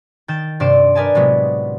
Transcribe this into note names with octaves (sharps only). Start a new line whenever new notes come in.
D#3 G5 G6 A6 E7
G2 C3 D5 C6 D7 E7
A#4 B4 D5 D#5 G#5 A5
A2 C3 F#3 G#3 B3